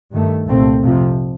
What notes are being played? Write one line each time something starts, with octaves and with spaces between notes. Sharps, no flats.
G2 D#3 A3
C2 A#2 A3 C4
F2 C3 F3